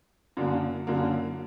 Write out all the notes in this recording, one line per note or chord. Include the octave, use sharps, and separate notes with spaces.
F#2 D3 F#3 A#3
F#2 D3 F#3 A#3